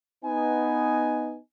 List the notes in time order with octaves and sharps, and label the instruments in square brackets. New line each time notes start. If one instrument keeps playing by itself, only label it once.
[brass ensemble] B3 D#4 G#5